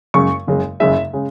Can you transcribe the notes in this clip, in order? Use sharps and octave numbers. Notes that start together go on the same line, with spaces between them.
F#1 F#2 C#3 G#3 C#6
F#1 F#2 C#3 G#3
F#1 F#2 C#3 G#3 E5
C#3 G#3